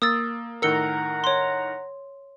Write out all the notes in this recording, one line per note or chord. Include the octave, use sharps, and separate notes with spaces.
A#3 D#6 E6 A6
A2 D#3 A#4 F#5 A#5 E6 C#7 G7
C#5 C6